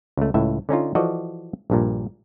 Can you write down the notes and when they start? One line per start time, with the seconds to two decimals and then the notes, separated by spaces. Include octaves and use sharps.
0.17 C#2 A3
0.34 C#2 A2 E5
0.69 D3 C#4 D#4 F4
0.95 E3 F3 F#4 A4 D5 D#5
1.70 A#1 G2 A#2